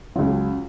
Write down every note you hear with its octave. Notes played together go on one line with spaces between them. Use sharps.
C#2 C#3 F#3 F4